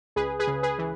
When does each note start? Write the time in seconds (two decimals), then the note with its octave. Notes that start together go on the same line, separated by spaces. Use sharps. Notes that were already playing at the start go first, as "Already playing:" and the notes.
0.16 C#2 G#4 B4
0.39 G#4 B4
0.47 C#3
0.63 G#4 B4
0.79 E3